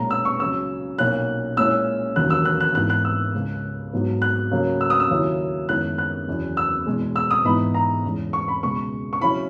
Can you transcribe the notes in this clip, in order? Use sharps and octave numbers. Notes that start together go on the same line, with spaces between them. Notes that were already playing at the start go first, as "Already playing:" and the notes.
Already playing: B1 A#2 G#3 C#4 A#5
E6
C#6
C#2 C#3 F#3 E6
B1 A#2 A#3 C#4 F#6
A#2 G#3 C#4 E4 E6
E1 D#2 C#3 F#3 F#6
E6
F#6
F#6
G#2 E3 B3 F#6
F#6
E6
C#2 C#3 G#3
G#2 F#3 B3
F#6
C#2 C#3 F#3 A#3
E6
D#6
E6
D#2 C#3 F#3 C#4 E4
F#2 D#3 G#3 B3 E4 F#6
F#6
F#1 E2 C#3 F#3
E6
E2 B2 G#3
E6
D#6
G#2 E3 B3 D#4 B5
A#5
E2 C#3 E3 G#3
C#6
B5
C#2 B2 G#3 C#6
C#6
C#3 F#3 C#4 E4 B5